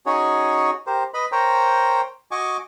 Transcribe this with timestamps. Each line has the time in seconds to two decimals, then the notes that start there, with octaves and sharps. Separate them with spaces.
0.06 C#4 D#4 F#4 G#4 C#5
0.87 G4 A#4 C5
1.14 B4 D#5 B5
1.32 A#4 C5 C#5 G5 A#5
2.31 F#4 D#5 G#5 C#6 D6